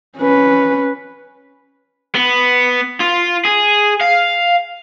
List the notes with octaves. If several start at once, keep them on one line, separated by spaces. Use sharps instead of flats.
C#4 B4
B3
F4
G#4
F5